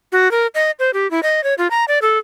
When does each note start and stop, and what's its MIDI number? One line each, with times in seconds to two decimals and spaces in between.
0.12 0.31 66
0.31 0.47 70
0.55 0.71 75
0.79 0.91 72
0.94 1.10 67
1.11 1.20 64
1.23 1.44 75
1.44 1.54 73
1.58 1.67 65
1.71 1.85 82
1.88 1.99 74
2.02 2.18 69